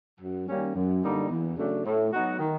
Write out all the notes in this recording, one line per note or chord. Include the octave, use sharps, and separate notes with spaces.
F#2
D#3 G3 A#3 C#4
F#2
D3 G3 A#3 D#4
E2
C#3 F#3 A3 D4
A2
F#3 B3 D#4 F#4
D#3